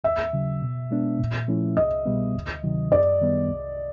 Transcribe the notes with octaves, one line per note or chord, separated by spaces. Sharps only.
D#2 E5
C#3 F#3
B2
G#3 B3 D4
A#2
F3 A3 C#4 E4
C2 D#5
B2 G3 B3
D2
C3 D#3 F#3
F#2 D5
D#3 G3 B3
C2